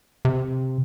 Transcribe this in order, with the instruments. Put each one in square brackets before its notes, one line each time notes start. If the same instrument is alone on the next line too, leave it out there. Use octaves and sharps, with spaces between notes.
[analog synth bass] C3